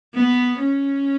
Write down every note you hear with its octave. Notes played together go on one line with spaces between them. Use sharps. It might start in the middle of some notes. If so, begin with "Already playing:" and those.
B3
C#4